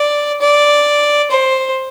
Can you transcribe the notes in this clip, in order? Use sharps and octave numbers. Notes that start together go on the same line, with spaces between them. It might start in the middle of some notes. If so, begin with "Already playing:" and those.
Already playing: D5
D5
C5